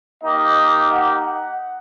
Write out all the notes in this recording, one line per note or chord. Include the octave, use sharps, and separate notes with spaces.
A#3 D#4 G4 D#5
F#5